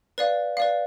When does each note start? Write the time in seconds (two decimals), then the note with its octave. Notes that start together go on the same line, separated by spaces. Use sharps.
0.18 B4 D5 F5
0.57 B4 D5 F5